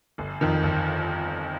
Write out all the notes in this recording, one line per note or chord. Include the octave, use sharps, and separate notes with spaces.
G1
F2 D#3
G1